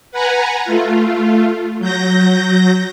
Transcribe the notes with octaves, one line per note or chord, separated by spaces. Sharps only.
B4 F#5 G#5 A#5
A3 F4
F#3 G6 A#6